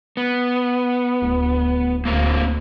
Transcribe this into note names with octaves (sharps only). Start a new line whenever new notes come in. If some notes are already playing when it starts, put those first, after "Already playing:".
B3
D1 D2
D2 A#3 C4 F5